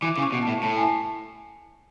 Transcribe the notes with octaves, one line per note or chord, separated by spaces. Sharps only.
E3 D6
C#3 D6
C#6
B2
A2 A5
A2 A5
G#5
A5